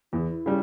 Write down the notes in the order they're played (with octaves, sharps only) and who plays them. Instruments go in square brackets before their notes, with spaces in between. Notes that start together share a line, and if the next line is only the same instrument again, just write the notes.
[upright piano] E2 [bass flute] E4
[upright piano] C#3 G3